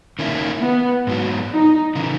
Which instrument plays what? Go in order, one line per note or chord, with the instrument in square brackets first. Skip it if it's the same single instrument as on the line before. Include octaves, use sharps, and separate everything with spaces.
[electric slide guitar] D#3 A#3 C#4 E4
[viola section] B3
[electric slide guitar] G#2 F#3 B3 F#4
[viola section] D#4
[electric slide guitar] C#3 E3